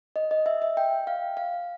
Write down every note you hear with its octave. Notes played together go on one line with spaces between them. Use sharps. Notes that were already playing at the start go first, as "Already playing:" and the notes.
D#5
D#5
E5
E5
G5
F5
F5